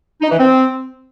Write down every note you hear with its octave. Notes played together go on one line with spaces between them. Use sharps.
D#4
E3
C4